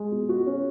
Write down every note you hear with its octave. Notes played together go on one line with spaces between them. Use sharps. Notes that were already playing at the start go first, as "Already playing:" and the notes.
Already playing: G#3
B2
F#4
C#4